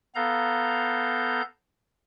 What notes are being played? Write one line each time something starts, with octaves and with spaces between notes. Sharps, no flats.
B3 A4 F5 A#5 G6